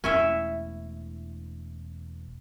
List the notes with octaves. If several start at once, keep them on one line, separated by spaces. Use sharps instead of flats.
E1 A3 C#4 E4 E5